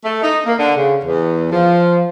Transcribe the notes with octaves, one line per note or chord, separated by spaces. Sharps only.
A3
D#4
A#3
D3
C#3
E2
F3